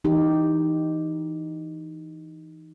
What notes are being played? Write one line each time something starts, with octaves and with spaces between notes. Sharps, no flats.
E3 D#4 G4